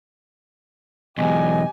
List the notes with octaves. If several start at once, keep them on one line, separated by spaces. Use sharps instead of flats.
B1 E2 G4 D#5 G#5